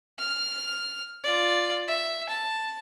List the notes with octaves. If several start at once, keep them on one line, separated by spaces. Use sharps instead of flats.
F6
F4 D5
E5
A5